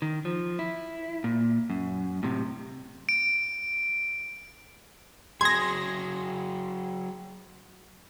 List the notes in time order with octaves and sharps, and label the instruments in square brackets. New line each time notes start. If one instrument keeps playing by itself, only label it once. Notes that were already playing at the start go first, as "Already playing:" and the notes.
[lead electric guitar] D#3
F3
E4
A#2
F#2
A2 C3
[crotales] D7
[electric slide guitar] F#3 G#4 [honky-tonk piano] C6 D#6 [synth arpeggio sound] G#6 A#6